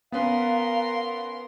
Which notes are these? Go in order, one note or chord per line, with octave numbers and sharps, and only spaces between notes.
B3 C#4 A#4 B4 F5 C6